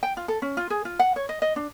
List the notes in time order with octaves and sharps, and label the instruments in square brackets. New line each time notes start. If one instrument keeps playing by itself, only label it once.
[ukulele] G5
F4
A4
C#4
F4
G#4
F4
F#5
C#5
D#5
D#5
D4